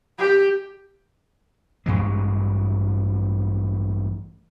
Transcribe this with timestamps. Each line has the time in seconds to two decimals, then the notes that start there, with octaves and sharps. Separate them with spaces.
0.19 G4
1.86 A1 G2 E3 G#3